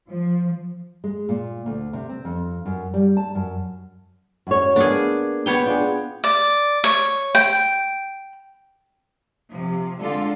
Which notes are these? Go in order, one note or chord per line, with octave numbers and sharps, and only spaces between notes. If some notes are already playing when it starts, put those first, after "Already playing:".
F3
G#3
A#2
D2
C3
C4
F2
F#2
G3
A5
F#2
F#2 C#5
A#3 B3 D4 G#4
B3 C#5 G5
D4 F4 G#4
D5
C#5
G5
C3 F3
D3 G#3 F4 A4